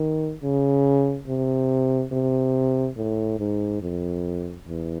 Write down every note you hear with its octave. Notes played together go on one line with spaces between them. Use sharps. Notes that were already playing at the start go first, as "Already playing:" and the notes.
Already playing: D#3
C#3
C3
C3
A2
G#2
F2
E2